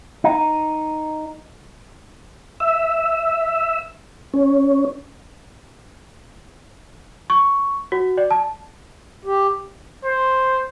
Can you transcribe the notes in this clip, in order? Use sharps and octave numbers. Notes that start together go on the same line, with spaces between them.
D#4
E5
C#4
C#6
F#4
D5
A5
G4
C5